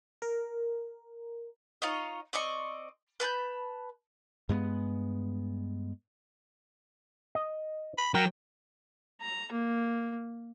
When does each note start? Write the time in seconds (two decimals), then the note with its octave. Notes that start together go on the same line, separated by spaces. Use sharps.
0.22 A#4
1.82 D#4 F4 C#5 D#5
2.33 C4 D5 D#5 C#6
3.20 B4 A5 B5 G6
4.49 G2 G#3 A#3 B3
7.35 D#5
7.98 B5
8.14 F#3 A#4 G5
9.21 A#5
9.51 A#3